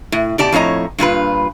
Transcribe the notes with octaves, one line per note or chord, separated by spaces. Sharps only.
A2
B2 G4 D5 A5
F2 A2 C#5 D#5 A#5
G2 A#2 F4 B4